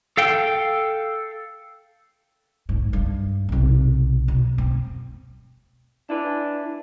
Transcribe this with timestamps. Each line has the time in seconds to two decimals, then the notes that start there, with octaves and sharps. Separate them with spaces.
0.17 A4 F5 G5
2.69 G#2
2.93 G2
3.49 B1 C3
4.28 B2
4.58 C4
6.10 D4 E4 B4